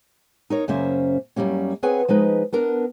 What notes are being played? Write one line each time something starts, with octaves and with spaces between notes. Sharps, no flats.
D#4 A#4 C#5
F#2 C#3 A#3 C#4 C5 E5
F#2 F3 G3 A#3 C#4
C4 G#4 B4 C#5 F#5 G#5
F3 G#3 D#4 B4
B3 D4 A#4